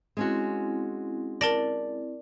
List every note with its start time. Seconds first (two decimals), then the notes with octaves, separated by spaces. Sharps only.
0.17 G#3 C4 C#4 E4 F#4
1.41 A#4 D5 A5 A#6